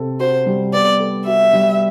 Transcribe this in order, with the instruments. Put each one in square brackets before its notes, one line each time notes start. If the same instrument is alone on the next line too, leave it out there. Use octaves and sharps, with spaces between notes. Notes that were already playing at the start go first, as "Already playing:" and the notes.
Already playing: [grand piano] C3 C4 A4
[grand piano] F#4 [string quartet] C5
[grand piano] G3
[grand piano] B3 [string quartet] D5
[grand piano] A4
[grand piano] F#4 [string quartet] E5
[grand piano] G3